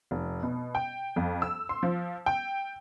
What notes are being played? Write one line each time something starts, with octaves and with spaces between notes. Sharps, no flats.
F1
B2
G5
F2
E6
C6
F3
G5